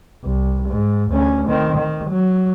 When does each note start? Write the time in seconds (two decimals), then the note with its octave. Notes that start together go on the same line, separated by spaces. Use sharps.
0.24 C2
0.68 G#2
1.10 D2 C#4
1.48 D#3 C4
1.76 D#3
2.09 F#3